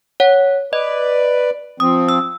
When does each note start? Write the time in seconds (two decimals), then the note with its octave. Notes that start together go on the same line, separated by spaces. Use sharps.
0.20 C#5 F#5
0.73 B4 D5 D#5
1.80 F3 C4 D#6
2.09 E6